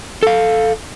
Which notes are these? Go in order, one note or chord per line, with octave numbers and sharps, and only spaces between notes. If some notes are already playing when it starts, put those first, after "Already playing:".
A4 F5